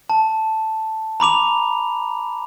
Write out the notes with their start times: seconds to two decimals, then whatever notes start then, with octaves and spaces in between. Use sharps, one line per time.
0.10 A5
1.20 A#5 B5 D6 F7